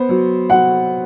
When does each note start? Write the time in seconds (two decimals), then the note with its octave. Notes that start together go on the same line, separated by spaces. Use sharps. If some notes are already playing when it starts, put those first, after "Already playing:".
Already playing: B3 C5
0.09 F#3
0.50 F#3 F#5